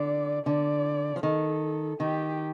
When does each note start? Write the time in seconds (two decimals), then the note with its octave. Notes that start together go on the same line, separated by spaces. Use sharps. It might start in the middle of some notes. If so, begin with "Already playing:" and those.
Already playing: D3 D5
0.46 D3 D5
1.16 F3
1.23 D#3 A4
2.00 D#3 G4